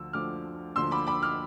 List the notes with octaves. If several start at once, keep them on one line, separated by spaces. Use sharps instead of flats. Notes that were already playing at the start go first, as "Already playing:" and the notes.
Already playing: D2 D3 F3 E6
D2 D3 F3 D6 F6
D2 D3 F3 C6 E6
B5 D6
B5 D6
D6 F6